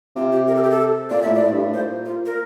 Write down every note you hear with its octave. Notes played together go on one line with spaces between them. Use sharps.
C3 F4
G4
A#4
A4
G4
A4
A#2 D5
A2 E5
D5
A2
G2
A2
A#2 C5
F4
A#4